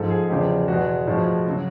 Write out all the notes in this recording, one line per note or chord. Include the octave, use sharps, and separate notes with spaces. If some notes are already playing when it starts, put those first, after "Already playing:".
Already playing: G#2 F3 G#3 A4
G#4
E2 C#3 F3 G#3 G4
E2 B2 G#3 F#4
A2 F3 G#3
C#3 F#3